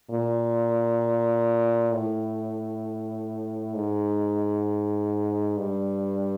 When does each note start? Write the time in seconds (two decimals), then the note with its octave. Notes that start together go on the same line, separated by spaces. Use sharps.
0.11 A#2
1.93 A2
3.75 G#2
5.57 G2